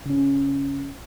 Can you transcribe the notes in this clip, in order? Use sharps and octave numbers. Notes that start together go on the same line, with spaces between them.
C#3 C#4